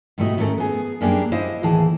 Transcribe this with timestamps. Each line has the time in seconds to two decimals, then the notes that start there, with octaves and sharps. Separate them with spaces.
0.18 G#2 B2 G3 A3 E4 D#5
0.37 D#2 G#2 A3 C#4 A4 A#4
0.58 B3 G#4
1.01 F#2 G3 A#3 D4 G4 G#4
1.32 E4 C5 D#5 F5
1.63 D#2 A2 E3 G#4 A5